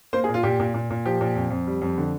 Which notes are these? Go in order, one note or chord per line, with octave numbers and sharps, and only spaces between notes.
A#3 C5
G#4
A#2
F4
A#2 G4
A#2
A#2
A#2
F3 G4
A#2
F2
F2
G3
F2
D3